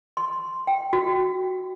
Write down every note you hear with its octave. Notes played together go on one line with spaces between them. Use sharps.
C6
G5
F#4